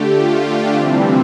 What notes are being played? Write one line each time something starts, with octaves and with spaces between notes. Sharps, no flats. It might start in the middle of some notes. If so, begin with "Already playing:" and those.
Already playing: D3 A3 G4
F4
D4
C3 E3 G3 C4